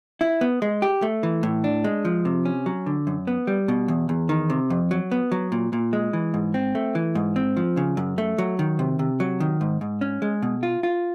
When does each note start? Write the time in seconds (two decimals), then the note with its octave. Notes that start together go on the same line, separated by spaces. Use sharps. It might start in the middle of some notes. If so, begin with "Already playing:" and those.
0.21 E4
0.41 B3
0.62 G#3
0.82 G4
1.02 A3
1.23 E3
1.43 A2
1.64 D4
1.84 G#3
2.05 F3
2.25 C3
2.45 C#4
2.66 F#3
2.86 D3
3.07 F#2
3.27 B3
3.47 G3
3.68 B2
3.88 E2
4.09 E2
4.29 D#3
4.50 C3
4.70 F2
4.91 F#3
5.11 B3
5.32 F#3
5.52 A#2
5.73 A#2
5.93 G#3
6.13 E3
6.34 G#2
6.54 C4
6.75 A3
6.95 E3
7.15 G#2
7.36 C4
7.57 F3
7.77 C#3
7.97 F#2
8.18 A3
8.38 F#3
8.59 D#3
8.79 C3
8.99 C3
9.20 F#3
9.40 D#3
9.61 G#2
9.81 G#2
10.01 C#4
10.22 G#3
10.42 B2
10.63 F4
10.83 F4